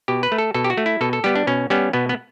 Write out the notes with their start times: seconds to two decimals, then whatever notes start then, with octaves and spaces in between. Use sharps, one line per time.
0.08 B2 G4
0.23 B4
0.32 A3
0.38 A4
0.54 B2 A4
0.64 G4
0.70 F#4
0.78 A3
0.86 E4
1.01 B2 A4
1.13 A4
1.24 G3 B3 G4
1.36 D4
1.47 B2 C#4
1.70 G3 B3 C#4
1.93 B2 B3
2.09 B3